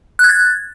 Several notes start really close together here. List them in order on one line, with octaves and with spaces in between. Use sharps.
F#6 G#6 A6